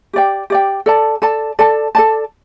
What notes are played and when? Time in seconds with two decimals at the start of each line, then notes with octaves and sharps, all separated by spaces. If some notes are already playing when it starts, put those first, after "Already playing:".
0.13 G4 D5 G5
0.50 G4 D5 G5
0.86 A4 D5 A5
1.22 A4 D5 A5
1.59 A4 D5 A5
1.95 A4 D5 A5